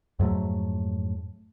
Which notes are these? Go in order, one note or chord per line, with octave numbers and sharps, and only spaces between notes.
F2 G#2 F#3 A3